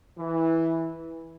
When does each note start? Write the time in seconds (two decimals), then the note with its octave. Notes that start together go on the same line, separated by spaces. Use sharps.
0.18 E3